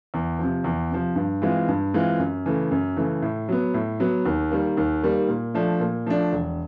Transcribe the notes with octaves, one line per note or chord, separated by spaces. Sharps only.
E2
C3 F3
E2
C3 F3
G2
E3 G#3 C4 F4
G2
E3 G#3 C4 F4
F#2
C#3 E3 A3
F#2
C#3 E3 A3
A2
F#3 B3
A2
F#3 B3
D#2
D#3 G3 A#3
D#2
D#3 G3 A#3
A#2
F3 A3 D4
A#2
F3 A3 D4
E1